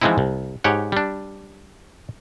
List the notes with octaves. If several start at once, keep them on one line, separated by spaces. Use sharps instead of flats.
E3 F3 G#3 C4 D#4 E4
C2
G#2 G4 C#5 F#5
G3 D4